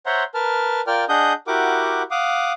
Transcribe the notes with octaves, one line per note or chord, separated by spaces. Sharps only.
C5 C#5 E5 F#5 A#5 C6
A#4 B4 A5 F6
F4 A#4 D5 G5 F6
D4 G#4 D#5 F#5 D#6 G6
E4 F#4 G4 A#4 F#5 D6
F5 F#5 D6 D#6